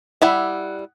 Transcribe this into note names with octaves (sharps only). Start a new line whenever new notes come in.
G3 E4 E5 F#5